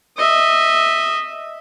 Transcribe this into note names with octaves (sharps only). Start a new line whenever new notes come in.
D#5 E5